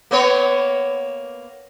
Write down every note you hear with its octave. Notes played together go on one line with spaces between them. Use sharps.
A#3 B3 C#5